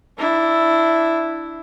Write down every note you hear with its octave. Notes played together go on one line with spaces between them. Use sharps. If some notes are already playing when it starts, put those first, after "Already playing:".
D4 E4